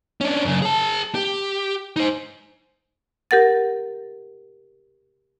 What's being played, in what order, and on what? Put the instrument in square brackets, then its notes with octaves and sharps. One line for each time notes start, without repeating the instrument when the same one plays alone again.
[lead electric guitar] C#4 D4
F#2 C#3
G#4 A5
G4
D#4 C5
[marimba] G4 A#4 F#5 A6